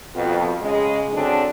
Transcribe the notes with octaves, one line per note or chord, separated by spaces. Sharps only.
F2 B2
C#3 G#3
D3 F#3 C4 D4 G#4 A4